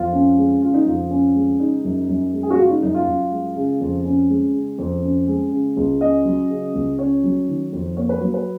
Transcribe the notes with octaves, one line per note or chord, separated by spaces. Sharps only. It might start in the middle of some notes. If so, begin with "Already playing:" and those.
Already playing: F2 F4
C#4
G#3
C#3 F4
D#4
F2 F4
C#4
G#3
C#3 D#4
F#2
F#2
G#3
G#4
F#4
C#3 F4
D#4
F#2 D#4
F4
F#2
G#3
C#3
F2
C#4
G#3
C#3
F2
C#4
G#3
C#3
C#2
C#4 D#5
F#3
C#3
C#2
C#4 C#5
F#3
D#3
F2
A#3 C#5
B4
F#3
B4